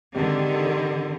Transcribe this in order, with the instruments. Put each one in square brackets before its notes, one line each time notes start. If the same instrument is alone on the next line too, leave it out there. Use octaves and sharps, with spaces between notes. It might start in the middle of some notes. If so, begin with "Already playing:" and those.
[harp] G#2 C4 G4 [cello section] D3 D#3